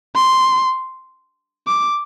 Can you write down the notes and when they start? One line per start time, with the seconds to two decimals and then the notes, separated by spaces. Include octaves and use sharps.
0.16 C6
1.67 D6